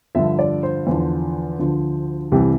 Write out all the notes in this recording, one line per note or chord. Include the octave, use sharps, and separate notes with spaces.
G2 D3 F3 E5
D5
C5
E2 D3 F3
D2 D3 F3
C2 C3 E3 G4